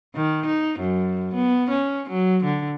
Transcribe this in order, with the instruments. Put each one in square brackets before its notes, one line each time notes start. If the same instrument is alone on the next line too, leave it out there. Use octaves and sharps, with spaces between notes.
[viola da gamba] D#3
D#4
F#2
B3
C#4
F#3
D3